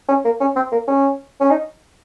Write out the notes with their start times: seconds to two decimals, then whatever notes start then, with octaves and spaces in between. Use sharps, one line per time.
0.08 C#4
0.25 A#3
0.40 C#4
0.56 C4
0.72 A#3
0.87 C#4
1.40 C#4
1.50 D#4